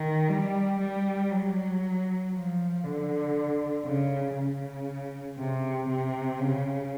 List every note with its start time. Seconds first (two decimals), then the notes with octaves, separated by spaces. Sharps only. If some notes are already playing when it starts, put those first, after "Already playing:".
Already playing: D#3
0.29 G3
0.79 G3
1.31 F#3
2.33 F3
2.83 D3
3.85 C#3
4.36 C#3
5.38 C3
5.89 C3
6.40 C#3